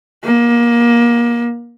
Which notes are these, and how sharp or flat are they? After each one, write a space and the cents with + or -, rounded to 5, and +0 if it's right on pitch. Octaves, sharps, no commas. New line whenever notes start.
A#3 +25